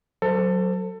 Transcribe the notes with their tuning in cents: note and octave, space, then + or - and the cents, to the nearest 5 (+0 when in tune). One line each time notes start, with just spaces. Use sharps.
F#3 +0 A4 +25 C5 -15